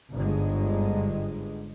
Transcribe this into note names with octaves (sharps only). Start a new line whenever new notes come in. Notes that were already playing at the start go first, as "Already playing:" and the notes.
G1 G#2 D3 G#3